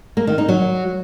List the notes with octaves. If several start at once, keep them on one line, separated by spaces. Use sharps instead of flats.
A#3
D#3
D#4
F#3